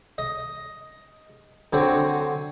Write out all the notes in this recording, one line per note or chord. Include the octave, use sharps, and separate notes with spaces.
D#5
D3 F#3 C4